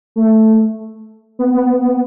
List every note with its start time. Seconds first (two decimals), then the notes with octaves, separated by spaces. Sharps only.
0.16 A3
1.39 B3
1.54 B3
1.70 B3
1.85 B3